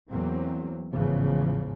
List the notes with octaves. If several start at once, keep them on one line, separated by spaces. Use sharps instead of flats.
E2 E3 F#3 A#3 C4
A1 E2 G#2 C#3 E3 F3